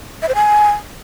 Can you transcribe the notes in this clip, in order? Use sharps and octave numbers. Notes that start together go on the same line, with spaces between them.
E5
C5
G#5